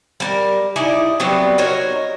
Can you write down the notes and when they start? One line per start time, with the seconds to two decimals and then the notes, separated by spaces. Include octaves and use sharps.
0.20 G3 A#4
0.76 D#4 E4 G#4 D5
1.20 F#3 G3 B3 C4
1.58 D#4 F#4 A#4 C#5